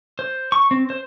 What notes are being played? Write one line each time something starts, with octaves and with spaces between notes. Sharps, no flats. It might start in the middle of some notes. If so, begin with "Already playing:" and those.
C5
C#6
C4
C5